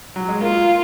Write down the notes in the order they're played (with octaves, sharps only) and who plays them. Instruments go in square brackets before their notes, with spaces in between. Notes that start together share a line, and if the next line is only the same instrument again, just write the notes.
[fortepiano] F#3
G#3
[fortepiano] A#3 [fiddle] F4